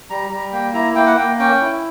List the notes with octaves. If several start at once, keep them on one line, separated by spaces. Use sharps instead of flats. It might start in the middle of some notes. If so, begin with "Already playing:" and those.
G3 A#5
G3 A#5
A#3 G5
E4 A#5
A#3 G5
F#5
A#3 G5
C#4 G5
E4